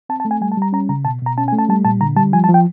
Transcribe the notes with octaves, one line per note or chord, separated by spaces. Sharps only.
C4 A5
A5
A3
G#5
G3 G#5
A5
G3 A#5
C#4 A#5
C#3 A#5
B2 A5
B2 A#5
C#4 A5
G#5
A3
A5
G3 A5
A#2 A5
D3 A#5
G3 A5
F3 G#5
A5
F3
G5